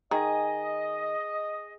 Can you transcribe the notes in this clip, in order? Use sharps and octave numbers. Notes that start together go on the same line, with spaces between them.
D#3 G#4 D#5